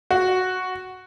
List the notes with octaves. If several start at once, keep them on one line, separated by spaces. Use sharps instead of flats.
F#4